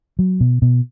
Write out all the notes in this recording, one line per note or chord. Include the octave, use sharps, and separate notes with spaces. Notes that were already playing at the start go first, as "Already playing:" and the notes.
F#3
B2
B2